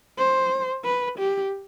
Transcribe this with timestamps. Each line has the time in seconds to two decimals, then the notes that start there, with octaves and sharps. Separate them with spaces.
0.18 C5
0.85 B4
1.18 G4